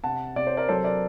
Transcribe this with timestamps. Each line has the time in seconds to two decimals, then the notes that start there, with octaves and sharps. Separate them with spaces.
0.04 C3 F#5 A5
0.36 C3 D5
0.47 C5
0.57 A#4 D5
0.68 F#3 A4 C5
0.84 A#4 D5